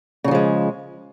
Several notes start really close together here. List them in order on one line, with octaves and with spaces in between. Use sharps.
C#3 F#3 F3 G#3